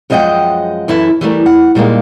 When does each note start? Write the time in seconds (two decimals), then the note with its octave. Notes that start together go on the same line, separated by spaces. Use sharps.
0.10 F#2 F3 G#3 D#5 F#5 G5
0.88 F#2 E3 E4 A4 E5
1.21 E3 G3 A3 A#4
1.46 F#5
1.75 A#2 G3 G#3 A#3 D#4